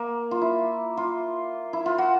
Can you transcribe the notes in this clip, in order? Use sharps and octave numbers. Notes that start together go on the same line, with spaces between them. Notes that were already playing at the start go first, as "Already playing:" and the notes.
Already playing: A#3
F4
E4
F4
E4
F4
F#4